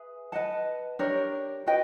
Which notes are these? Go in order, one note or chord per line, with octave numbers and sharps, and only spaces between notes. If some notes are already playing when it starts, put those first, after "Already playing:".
Already playing: G#4 B4 E5
B4 D#5 F#5 A5
D4 G4 A#4 C#5
F#4 B4 D#5 G5